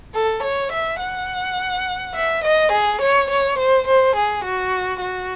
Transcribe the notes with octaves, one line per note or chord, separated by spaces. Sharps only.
A4
C#5
E5
F#5
E5
D#5
G#4
C#5
C#5
C5
C5
G#4
F#4
F#4